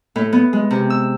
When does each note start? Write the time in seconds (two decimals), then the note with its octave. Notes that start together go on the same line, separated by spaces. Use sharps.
0.16 A2
0.33 B3
0.53 G#3
0.71 C3
0.90 E6